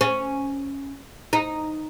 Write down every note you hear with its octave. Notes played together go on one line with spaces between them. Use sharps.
C#4
D#4